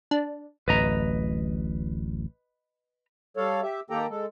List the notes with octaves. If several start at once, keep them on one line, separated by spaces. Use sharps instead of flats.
D4
D1 A1 B4 D#5 A#5
G3 A4 C#5 F5
G4 E5
D#3 A#3 G4 A4 G5 A#5
G#3 A4